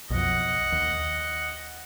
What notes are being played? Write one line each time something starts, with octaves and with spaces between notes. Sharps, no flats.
B1 F2 D#5 F#5
D#2